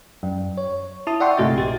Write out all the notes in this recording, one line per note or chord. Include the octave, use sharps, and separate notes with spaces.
F#2
C#5
E4 A5 D#6
D5 E5 F#5 G5 C6 C#6
G1 C3 A3 F#4 D#5 A6
A#1 G4 A6